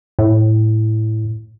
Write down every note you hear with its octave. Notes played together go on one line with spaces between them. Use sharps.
A2